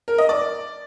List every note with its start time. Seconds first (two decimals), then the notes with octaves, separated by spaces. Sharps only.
0.08 A#4
0.18 D#5
0.29 D5